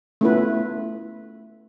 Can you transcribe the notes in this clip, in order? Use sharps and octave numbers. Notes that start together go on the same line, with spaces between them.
A3 B3 C#4 E4 F4 B4